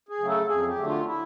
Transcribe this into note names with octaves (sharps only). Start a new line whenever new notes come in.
G#4
C#3 F#3 A3
A4
F2 G#4
G4
D3 F#3 A3
F4
E4